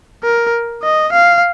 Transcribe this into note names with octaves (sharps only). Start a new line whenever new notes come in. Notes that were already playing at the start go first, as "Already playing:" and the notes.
A#4
D#5
F5